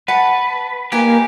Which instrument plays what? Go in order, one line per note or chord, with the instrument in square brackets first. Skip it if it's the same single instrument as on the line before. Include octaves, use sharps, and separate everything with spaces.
[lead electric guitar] B4 [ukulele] F#5 [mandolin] A5
[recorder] A#3 [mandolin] D#4 G#5 [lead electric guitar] G4 [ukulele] B4